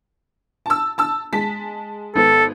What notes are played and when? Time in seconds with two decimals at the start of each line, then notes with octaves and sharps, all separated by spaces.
0.66 A5 E6
0.98 A5 E6
1.33 G#3 A5 B6
2.15 G#1 B3 A4